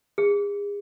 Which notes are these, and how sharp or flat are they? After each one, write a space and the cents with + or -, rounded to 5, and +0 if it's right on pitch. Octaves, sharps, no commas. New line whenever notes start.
G#4 -35